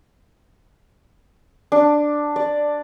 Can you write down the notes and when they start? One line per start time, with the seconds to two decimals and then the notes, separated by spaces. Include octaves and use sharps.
1.72 D4
2.36 D5